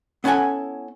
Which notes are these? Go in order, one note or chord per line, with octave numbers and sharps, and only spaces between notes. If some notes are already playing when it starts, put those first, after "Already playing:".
B3 C#4 E4 A4 F#5 G#5